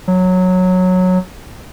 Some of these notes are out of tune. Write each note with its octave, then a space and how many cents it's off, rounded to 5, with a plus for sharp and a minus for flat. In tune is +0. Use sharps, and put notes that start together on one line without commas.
F#3 -10